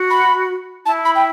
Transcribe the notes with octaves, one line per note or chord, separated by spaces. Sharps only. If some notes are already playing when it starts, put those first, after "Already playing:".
Already playing: F#4
B5
E4 A5
B5
G5